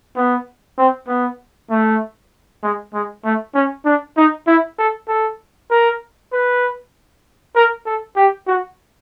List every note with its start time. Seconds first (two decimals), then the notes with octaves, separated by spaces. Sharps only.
0.16 B3
0.78 C4
1.08 B3
1.71 A3
2.63 G#3
2.94 G#3
3.25 A3
3.55 C#4
3.85 D4
4.17 D#4
4.47 E4
4.79 A4
5.08 A4
5.71 A#4
6.33 B4
7.56 A#4
7.86 A4
8.16 G4
8.47 F#4